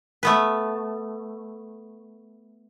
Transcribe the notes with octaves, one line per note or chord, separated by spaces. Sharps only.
A3 B3 B4